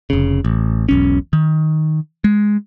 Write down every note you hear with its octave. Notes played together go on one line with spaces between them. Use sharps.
F1 C#3
A1
E1 B1 C#4
D#3
G#3